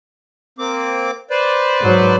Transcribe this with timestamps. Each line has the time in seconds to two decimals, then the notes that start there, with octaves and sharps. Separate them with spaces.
0.59 A#3 C4 D6
1.30 B4 C5 D5
1.80 G#2 F#3